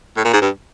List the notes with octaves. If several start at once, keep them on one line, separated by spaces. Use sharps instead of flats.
A2
A#2
G#2
G2